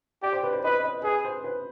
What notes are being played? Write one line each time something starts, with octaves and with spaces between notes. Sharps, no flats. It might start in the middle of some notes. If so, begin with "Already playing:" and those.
G4 D5
C5
B4
C5
B4 D#5
D#5
G#4 B4
C5
B4